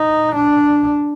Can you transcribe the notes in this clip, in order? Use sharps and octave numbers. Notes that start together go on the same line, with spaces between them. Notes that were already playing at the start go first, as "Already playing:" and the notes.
Already playing: D#4
D4